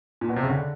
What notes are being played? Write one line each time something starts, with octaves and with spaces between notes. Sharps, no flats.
A#2
B2
C3
C#3
D3